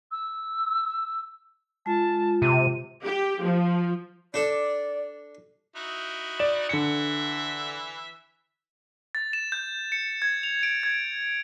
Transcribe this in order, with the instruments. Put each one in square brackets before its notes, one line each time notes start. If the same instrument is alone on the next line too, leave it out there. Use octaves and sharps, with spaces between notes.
[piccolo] E6
[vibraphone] G#3 F4 [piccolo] A5
[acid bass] C3 [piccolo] D#7
[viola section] G4
F3
[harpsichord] D4 A4 [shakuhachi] D5
[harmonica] D#4 E4 F#4
[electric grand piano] D5 E7
[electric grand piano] D3 C#7 [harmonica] E3 E5
[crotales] A6
E7
G6
C#7
G#6
F7
D7
G#6